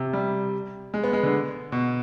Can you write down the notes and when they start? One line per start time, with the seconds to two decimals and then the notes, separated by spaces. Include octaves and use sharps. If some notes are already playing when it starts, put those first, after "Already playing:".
Already playing: C3
0.13 G3
0.94 G#3
1.04 B3
1.13 G#3
1.23 D3
1.72 B2